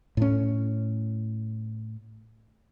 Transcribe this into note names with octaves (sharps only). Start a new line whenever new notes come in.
A2 C#4